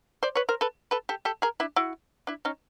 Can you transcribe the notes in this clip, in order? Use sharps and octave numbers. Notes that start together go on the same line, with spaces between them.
C5 D5
B4 C#5
A#4 C5
A4 B4
A4 B4
G4 A4
G4 A4
G#4 A#4
D4 E4
E4 F#4
D4 E4
C#4 D#4